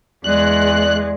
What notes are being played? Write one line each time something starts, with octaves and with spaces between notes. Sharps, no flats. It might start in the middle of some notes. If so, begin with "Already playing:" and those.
E2 G#3 D5 F#6